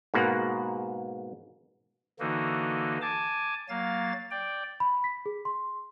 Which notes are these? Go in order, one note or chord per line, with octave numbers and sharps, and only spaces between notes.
G#2 B2 A#3 F#5
D3 E3 A#3 D#4 F#4
G#5 A5 D6
F#3 A#3 F5 A6
D5 G5
B5
B6
G#4
C6